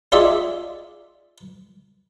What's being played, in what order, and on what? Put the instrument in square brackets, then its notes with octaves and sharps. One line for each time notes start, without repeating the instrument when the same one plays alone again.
[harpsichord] D#4 F4 G#4 D5 E5